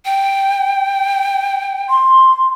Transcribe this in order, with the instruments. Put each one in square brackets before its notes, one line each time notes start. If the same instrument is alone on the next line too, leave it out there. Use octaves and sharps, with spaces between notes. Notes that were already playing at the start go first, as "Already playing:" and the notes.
[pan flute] G5
[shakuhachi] C6